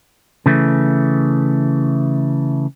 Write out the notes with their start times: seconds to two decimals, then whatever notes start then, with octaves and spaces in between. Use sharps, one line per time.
0.46 C#3 E3 A3